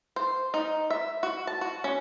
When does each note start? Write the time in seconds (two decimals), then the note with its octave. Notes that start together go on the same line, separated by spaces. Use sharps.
0.16 C5
0.54 D#4
0.90 E5
1.23 F#4
1.47 A5
1.61 F#4
1.84 C#4